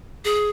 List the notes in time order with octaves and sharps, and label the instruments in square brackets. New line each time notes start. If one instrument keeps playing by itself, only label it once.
[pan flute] G#4